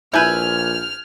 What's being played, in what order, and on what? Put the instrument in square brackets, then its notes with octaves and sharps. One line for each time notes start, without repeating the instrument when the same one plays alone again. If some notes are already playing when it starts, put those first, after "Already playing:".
[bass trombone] A#1 [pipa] E4 B4 [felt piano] G#5 G6 G#6 [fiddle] F6